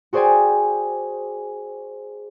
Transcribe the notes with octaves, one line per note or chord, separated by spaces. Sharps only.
F#4 G#4 C5 D5 G5 G#5